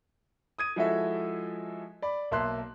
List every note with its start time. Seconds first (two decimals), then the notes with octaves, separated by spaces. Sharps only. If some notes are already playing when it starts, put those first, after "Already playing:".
0.59 D#6 G#6 D#7
0.76 F3 G#3 E4 F#4 A4 E5
2.02 D5 B5
2.31 B1 A#3 E5 A5 C6 F#6